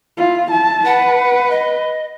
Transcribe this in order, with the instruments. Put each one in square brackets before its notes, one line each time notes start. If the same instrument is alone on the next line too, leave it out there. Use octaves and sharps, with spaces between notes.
[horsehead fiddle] E4 F4
E4 A5
[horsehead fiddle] B4 [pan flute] F#5
[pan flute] D#5